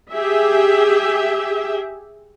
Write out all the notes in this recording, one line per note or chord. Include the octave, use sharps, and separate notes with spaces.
G4 G#4 E5